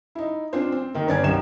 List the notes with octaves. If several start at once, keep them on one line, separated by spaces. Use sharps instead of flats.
D#4 E4
C4 D4 F4 C5
C4
D#3 A#3
G1 C#4 D5 G#6
C2 F#2 D#3 E7